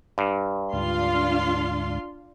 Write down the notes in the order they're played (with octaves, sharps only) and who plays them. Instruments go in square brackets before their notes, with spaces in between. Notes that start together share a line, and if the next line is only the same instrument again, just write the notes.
[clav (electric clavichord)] G2
[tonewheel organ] D2 G#2 [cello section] D4 F5 [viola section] F4 C6